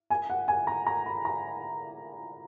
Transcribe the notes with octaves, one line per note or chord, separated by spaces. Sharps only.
G#5
F#5
G#5
A#5
A#5
B5
A#5